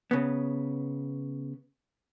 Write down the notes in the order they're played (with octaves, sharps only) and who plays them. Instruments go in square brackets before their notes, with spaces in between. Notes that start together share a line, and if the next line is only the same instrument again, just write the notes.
[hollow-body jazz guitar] C#3 B3